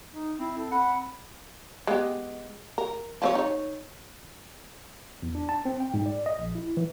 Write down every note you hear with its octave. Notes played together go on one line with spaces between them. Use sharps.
D#4
C4 E4
A4
C4 F#5 B5
G#3 B3 G4
A#4
F3 C4 C#5
D#4 C#5
E2
D4
A5
C4
G5
G#2
D5
D#5
A#1
E4
E3